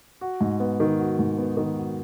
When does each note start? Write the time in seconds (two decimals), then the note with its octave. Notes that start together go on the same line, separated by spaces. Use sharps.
0.21 F#4
0.41 G#2
0.60 B3
0.80 D#3
0.99 F#4
1.19 G#2
1.38 B3
1.57 D#3
1.76 F#4